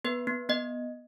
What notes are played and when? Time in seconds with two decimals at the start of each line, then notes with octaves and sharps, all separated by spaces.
0.04 B3 B4
0.27 B3
0.49 B3 D#5